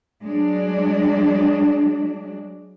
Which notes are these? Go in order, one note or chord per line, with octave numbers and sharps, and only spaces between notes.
F#3 G#3 D4